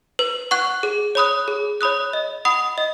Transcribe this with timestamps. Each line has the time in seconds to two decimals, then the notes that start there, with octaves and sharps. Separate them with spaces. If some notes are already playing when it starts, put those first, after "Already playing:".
0.19 B4
0.51 F#5 C#6 F#6
0.83 G#4
1.15 C#5 B5 D#6 F#6
1.48 G#4
1.81 C#5 B5 D#6 F#6
2.13 D#5
2.45 F#5 B5 D#6
2.78 D#5